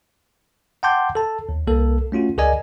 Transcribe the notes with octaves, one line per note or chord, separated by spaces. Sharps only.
F#5 G5 A5 C6 D6 G6
A4 A5
D#2
C2 A#3 A4
A3 C#4 F4 F#4
C#2 G#4 A#4 D5 D#5 G#5